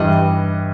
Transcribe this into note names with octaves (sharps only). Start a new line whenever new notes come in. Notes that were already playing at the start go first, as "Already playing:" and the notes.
Already playing: G2 E3 G3 D#5